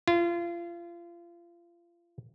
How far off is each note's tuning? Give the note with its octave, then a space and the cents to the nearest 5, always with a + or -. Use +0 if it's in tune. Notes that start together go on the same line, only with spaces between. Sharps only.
F4 -30